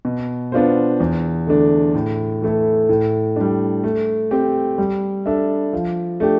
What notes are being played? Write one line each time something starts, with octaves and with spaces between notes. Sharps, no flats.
B2
B3 D4 F4 C5
E2
D3 A3 D4
A2
E3 A3 E4 A4
A2
G3 D4
A3
C4 G4
G3
D4 A4 E5
F3
A3 D4 G4